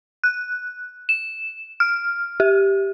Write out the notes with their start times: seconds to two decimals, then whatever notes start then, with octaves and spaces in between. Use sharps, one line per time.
0.24 F#6
1.09 E7
1.80 F6
2.40 G4